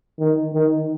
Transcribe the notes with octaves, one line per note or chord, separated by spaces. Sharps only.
D#3
D#3